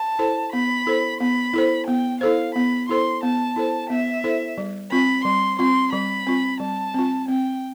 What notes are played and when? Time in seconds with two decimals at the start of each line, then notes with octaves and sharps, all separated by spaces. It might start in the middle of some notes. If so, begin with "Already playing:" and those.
Already playing: A5
0.19 E4 A4 C5
0.52 B3 B5
0.86 E4 A4 C5
1.20 B3 B5
1.53 E4 A4 C5
1.88 B3 G5
2.21 E4 A4 C5 F5
2.55 B3 B5
2.89 E4 A4 C5 C6
3.23 B3 A5
3.56 E4 A4 C5
3.90 B3 E5
4.24 E4 A4 C5
4.58 G3
4.91 C4 F4 B5
5.25 G3 C6
5.59 C4 F4 C6
5.93 G3 B5
6.27 C4 F4
6.60 G3 A5
6.94 C4 F4
7.28 C4 G5